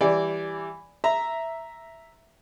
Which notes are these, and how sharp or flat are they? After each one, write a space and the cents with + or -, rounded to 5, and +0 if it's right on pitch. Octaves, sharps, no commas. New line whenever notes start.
E3 +0 G3 +10 D5 -10
E5 +0 A#5 +0